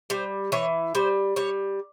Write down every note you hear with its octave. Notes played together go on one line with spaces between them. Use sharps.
G3 C5
E3 C#5
G3 C5
G3 C#5